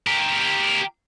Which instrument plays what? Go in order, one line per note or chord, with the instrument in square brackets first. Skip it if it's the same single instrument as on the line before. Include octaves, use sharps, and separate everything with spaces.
[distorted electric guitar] G4 A#4